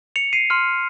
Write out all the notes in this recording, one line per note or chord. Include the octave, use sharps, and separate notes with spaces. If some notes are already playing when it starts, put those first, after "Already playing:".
C#7 F7
C7 D#7
C6 F6